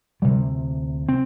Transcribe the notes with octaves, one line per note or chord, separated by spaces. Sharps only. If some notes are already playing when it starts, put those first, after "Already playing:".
D2 C3 G3
C4